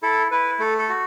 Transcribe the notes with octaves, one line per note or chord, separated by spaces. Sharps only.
E4 A4
E4 B4
A3 A4
A4
F#4